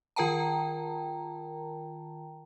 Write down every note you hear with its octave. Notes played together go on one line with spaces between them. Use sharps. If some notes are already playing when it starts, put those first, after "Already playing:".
D#3 F4 A#4 G5 A5 A#5